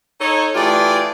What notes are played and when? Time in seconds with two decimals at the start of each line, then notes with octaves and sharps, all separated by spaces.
0.20 D#4 A4 C#5
0.55 E3 A3 F4 G4 G#4 D5